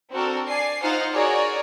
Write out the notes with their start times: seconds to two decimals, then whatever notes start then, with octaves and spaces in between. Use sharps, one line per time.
0.11 C4 D4 F#4 A4 A#4
0.48 D5 G#5 C7
0.82 D#4 F4 C5 F5 F#5
1.13 F#4 G#4 A#4 C#5 D5